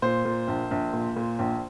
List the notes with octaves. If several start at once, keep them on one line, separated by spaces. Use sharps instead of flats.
A#2 C5
A#2
A#1
A#1
A#2
A#2
A#1